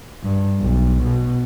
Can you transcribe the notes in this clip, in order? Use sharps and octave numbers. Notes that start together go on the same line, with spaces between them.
G2
B1
B2